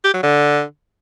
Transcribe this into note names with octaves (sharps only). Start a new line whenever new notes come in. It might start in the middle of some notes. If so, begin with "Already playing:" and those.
G4
F#3
D3